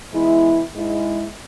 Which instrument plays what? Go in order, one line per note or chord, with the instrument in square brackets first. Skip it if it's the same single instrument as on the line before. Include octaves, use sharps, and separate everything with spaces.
[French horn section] E3 G#3 B3 E4
G#2 G#3 E4